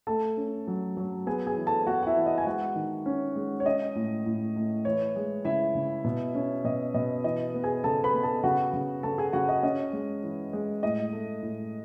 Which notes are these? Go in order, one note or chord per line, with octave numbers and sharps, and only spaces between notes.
A3 A4 A5
C#4
F#3
F#3
B3 G#4 G#5
G#4 G#5
E3
A4 A5
B3 F#4 F#5
F#5
E4 E5
E3
D#5
G#5
G#3 F#4 F#5
D#3
C#4
G#3
C#5
C#4 D#5
A2
A2
A2
E3 C#5
G#3
C#3 E4 E5
C#3
B2
C#4
B2 D#5
B2 D#5
E3 D#5
B3
G#4 G#5
C#3 A4 A5
B4 B5
B3
A4 A5
C#3 F#4 F#5
C#3
C#3 A4 A5
G#4 G#5
C#3 F#4 F#5
D#5
C#4 D#5
G#3
E3
G#3
A2 D#5
A3
A2